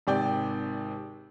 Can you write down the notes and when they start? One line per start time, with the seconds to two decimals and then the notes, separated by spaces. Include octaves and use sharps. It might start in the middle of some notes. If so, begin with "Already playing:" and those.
0.07 G#1 C3 D5 G5